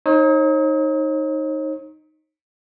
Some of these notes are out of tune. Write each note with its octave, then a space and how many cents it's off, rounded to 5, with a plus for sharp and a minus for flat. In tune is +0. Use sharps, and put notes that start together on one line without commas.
D#4 +0 C#5 -45 D#6 +40